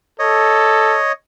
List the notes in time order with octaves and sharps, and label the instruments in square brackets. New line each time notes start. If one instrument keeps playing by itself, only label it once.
[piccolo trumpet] A4 [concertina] C#5 D#5